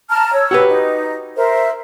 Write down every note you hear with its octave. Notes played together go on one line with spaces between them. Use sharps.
A5 A#5 F6
C#5 E6
F#4 G4 B4
D#4
A#4 C5 E5